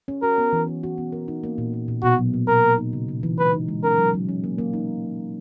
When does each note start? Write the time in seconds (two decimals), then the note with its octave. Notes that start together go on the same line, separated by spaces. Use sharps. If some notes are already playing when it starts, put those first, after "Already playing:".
0.08 C#4
0.22 F#4 A#4
0.38 B3
0.53 E3
0.67 E3
0.83 F#4
0.98 B3
1.12 A#4
1.28 D#4
1.44 A#3
1.58 A#2
1.73 A#3
1.88 A#2
2.03 B2 F#4
2.18 F#3
2.34 A#3
2.48 B2 A#4
2.63 A#3
2.78 D#4
2.93 C#3
3.08 C#3
3.23 E3
3.38 G#3 B4
3.53 D#4
3.68 G#3
3.83 C#4 A#4
3.98 F#3
4.14 F#3
4.29 C#4
4.44 A#3
4.58 A#3
4.73 D#4